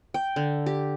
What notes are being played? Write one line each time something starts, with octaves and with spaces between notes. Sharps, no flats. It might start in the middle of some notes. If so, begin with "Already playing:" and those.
G5
D3
G4